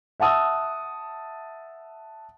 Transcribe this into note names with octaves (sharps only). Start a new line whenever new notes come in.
E5 F#5 A5 D#6 E6